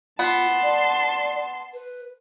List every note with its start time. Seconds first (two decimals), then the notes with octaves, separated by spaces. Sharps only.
0.19 B3 F4 A5 C6
0.62 D5
1.74 B4